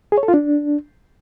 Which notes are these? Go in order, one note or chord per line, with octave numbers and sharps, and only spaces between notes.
G#4
C#5
A4
F4
D4